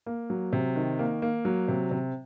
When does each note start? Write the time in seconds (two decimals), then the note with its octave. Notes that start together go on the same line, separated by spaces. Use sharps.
0.06 A#3
0.30 F#3
0.53 C3
0.76 D#3
0.99 A#3
1.22 A#3
1.45 F#3
1.68 C3
1.91 C3